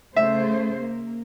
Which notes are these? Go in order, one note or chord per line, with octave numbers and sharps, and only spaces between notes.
C#3 A3 C5 E5
A#3